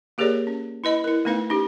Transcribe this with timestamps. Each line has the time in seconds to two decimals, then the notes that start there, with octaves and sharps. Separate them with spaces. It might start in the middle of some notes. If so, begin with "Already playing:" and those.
0.18 A#3 G4 G#4 A#4 C#5 D5
0.47 C#4
0.84 E4 B4 D#5 B5
1.04 E4 A#4
1.25 A3 B3 D#4 B4 F5
1.50 C#4 D#4 G4